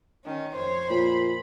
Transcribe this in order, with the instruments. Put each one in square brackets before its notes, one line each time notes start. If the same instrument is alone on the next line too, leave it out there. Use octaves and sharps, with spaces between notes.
[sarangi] D#3 [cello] C#4
[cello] F2 C5 [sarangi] C#5
[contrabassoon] A#2 [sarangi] B5